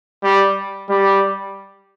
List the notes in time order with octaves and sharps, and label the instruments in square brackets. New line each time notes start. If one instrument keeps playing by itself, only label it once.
[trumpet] G3
G3